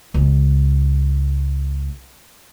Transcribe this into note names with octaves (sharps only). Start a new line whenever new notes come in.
C#2 G#3